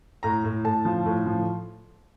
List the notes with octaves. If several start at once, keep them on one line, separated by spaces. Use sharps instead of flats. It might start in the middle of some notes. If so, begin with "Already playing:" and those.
A2 A#5
A2
A2 A5
F3
A2
F3